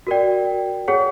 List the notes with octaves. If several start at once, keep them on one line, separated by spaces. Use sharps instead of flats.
F#4 A#4 D5 G5
G#4 C#5 F#5